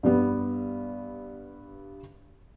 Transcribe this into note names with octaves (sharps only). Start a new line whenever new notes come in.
G2 G3 B3